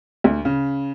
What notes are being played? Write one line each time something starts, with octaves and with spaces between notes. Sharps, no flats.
D2
C#3